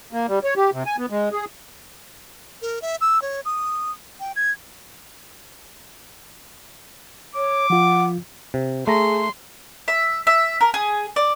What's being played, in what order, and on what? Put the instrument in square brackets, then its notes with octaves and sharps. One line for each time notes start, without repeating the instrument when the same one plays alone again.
[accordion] A#3
G3
C#5
G4
C3
G#5
B3
G#3
G#4
[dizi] A#4
E5
E6
C#5
D#6
G5
G#6
[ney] C#5 [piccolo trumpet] D6
[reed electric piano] F3 F4 [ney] F#5
[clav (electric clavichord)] C3
[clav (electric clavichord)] A3 A#5 [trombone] G#4 [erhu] C6
[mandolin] E5
E5
A#4
G#4
D5